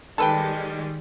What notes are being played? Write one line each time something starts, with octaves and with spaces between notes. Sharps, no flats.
D#3 G3 G#3 A4 B4 G5